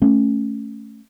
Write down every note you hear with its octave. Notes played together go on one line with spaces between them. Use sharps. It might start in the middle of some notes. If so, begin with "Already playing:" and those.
A3 C#4